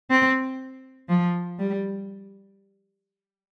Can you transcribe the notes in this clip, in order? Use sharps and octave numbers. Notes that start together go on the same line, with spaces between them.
C4
F3
G3